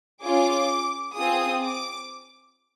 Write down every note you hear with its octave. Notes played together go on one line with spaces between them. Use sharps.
C#4 F4 G#4 D6
C4 F4 G#4 D#6
D6